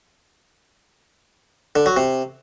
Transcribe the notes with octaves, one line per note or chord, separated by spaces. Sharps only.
D3
F#3
C3